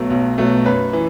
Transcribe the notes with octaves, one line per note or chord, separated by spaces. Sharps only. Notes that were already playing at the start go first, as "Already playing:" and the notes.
Already playing: B1 B2 F#3 A3 F#4
B1
B2 F#3 A3
F#2 B4
E3